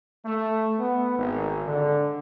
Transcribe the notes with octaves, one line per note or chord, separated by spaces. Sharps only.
A3
B3
G#1
D3